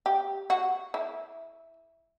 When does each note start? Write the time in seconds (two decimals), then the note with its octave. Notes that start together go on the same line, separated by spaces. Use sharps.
0.06 G4
0.50 F#4
0.94 E4